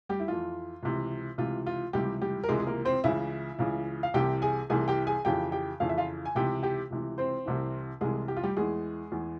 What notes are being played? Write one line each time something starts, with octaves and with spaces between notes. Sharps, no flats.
G3 G4
E4
F2 E3 F4
C#2 C3 E3
C#2 C3 E3 F4
F4
C#2 C3 E3 G3 G4
G3 G4
A#4
C#2 C3 E3 G#3 G#4
G#4
A#3 A#4
C4 C5
C#2 C#3 E3 E4 E5
C#2 C#3 E3
F5
C2 C3 E3 G4 G5
G#4 G#5
C2 C3 E3 G#4 G#5
G4 G5
G#4 G#5
F2 C#3 E3 G4 G5
G4 G5
F2 C#3 E3 F5
E5
F4 F5
G#5
C#2 C3 E3 G4 G5
G4 G5
C#2 C3 E3
C4 C5
C2 C3 E3
C2 C3 E3 G#3 G#4
G4
F4
G3 G4
E2 E3 G#3 G#4
E2 E3